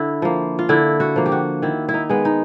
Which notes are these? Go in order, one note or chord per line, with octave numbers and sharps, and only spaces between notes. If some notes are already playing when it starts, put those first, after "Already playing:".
Already playing: D3 E4
F3 A#3
F4
D3 E4
F#4
F3 A#3
G4
F#4
D#3 E4
E4
D#4
G#3 B3
D#4